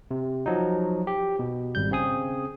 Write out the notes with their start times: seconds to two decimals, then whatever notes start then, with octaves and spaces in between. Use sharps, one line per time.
0.11 C3
0.46 F3 F#3 D#4
1.07 G4
1.39 B2
1.75 G#1 G3 G6
1.91 C#3 C4 G#4 D#6